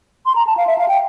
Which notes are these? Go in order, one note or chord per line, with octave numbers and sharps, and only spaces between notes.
C6
A#5
A5
F5
E5
F5
G5